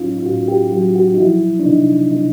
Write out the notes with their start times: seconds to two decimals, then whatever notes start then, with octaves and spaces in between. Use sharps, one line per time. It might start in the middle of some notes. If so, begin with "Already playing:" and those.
Already playing: A2 F#3 C#4 D#4 F4
0.19 F4
0.25 A2 F#4
0.48 G4
0.72 F#3 F#4
0.95 F#4
1.14 D#4
1.18 F3 E4
1.60 D4
1.65 C3 D#4
2.11 C3 D#4